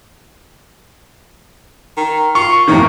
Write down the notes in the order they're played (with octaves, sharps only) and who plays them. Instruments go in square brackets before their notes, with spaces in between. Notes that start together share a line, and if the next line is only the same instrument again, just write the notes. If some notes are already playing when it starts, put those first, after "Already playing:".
[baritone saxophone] D#3
[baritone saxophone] F4 [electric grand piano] C#6
[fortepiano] E2 A2 D#3 [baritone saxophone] A#3